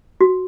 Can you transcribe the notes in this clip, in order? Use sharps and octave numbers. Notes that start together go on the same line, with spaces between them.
F#4